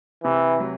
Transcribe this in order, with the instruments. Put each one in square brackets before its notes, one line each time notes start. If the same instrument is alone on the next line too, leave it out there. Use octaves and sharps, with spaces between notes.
[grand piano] C3 [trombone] E3
[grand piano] F#3